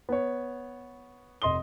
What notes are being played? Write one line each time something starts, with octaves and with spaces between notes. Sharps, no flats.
B3 C#5
F1 D#5 C6 D#6 G7